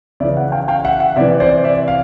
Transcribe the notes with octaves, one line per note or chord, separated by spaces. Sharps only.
C#3 E3 D5 E5
E5 F#5
F5 G5
F5 G5
E5 F#5
E5 F#5
C3 E3 D5 E5
C5 D5
D5 E5
F5